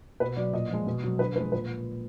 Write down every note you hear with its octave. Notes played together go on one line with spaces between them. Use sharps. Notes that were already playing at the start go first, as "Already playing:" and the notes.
B2 B4
F#3 D5
A#2 D#5
F3 G#3
B2
F#3
D3 B4
F3 G#3 B4
A#2 B4